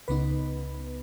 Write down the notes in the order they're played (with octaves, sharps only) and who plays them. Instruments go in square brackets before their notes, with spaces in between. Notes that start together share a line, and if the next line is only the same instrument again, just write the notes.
[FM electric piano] C#2 C#3 B3 D#4 B4